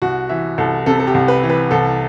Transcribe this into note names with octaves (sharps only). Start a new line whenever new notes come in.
C2 F#4
E3 E5
C2 A4
C3 A4
A4
G4
C2
B4
E3
B4
C2 A4